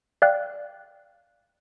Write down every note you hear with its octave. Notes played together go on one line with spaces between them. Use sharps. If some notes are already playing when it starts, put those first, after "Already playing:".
D5 F5 G5 F#6